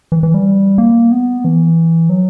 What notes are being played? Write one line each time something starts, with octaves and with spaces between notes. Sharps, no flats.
E3
E3
G3
A#3
B3
E3
F#3